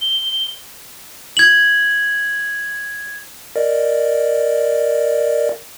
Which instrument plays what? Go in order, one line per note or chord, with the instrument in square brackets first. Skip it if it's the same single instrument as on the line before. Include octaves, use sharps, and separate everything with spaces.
[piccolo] G7
[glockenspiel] G#6 F#7
[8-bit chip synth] A#4 D5 D#5